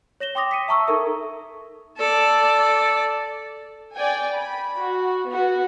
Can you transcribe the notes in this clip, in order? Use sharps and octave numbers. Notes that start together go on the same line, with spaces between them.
C#5 A#6 E7 G7
G5 C6 D6 D#6 A#6 F7
B6 C#7 D#7
E5 A5 A#5 C#6 D#6 E6
D#4 A4 A#4 E5
A4 D5
D5 G5 G#5
B5
F#4
B3 F#4